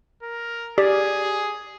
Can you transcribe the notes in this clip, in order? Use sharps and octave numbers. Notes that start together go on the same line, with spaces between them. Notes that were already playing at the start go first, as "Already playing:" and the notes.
A#4
G4 G#4 D5